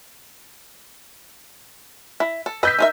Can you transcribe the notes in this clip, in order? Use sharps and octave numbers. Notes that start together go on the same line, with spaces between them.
E4
A4
B4 D#5 E6 G6 B6
D#4 A#4 E5